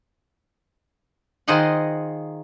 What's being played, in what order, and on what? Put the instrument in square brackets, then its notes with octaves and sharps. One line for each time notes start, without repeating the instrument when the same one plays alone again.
[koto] D#3 F4 G#4 C5 D#5 F#5